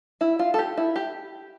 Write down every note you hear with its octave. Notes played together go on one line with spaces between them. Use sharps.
E4
F4
A4
G4
E4
G4